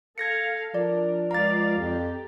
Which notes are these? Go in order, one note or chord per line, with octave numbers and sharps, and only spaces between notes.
A4 F5 G#6 A#6 C#7
F3 D4 A#4 D5
C#2 D5 F5 A#5 A6
F2 G4